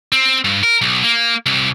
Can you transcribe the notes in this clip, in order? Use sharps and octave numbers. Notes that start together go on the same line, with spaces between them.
C4
G2
A#4
B1
A#3
C2